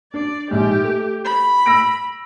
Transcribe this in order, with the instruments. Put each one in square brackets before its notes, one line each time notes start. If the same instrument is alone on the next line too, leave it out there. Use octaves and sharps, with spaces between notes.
[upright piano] D4 [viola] D5
[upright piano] A#1 G#2 [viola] G4
[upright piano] A3
[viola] B5
[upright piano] E6 A#6 D7